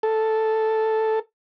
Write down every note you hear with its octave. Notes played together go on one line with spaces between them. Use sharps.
A4